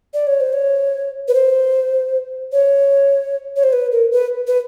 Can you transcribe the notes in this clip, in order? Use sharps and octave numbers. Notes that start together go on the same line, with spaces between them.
D5
C#5
C5
C#5
B4
C5
C#5
C#5
C5
B4
A#4
B4
B4